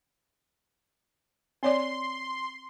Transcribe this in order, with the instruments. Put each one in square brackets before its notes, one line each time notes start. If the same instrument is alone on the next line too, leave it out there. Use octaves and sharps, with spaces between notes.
[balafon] C4 C#5 D5 [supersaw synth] C6